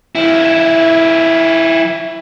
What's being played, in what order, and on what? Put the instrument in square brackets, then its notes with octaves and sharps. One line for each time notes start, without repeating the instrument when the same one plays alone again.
[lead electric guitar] F3 E4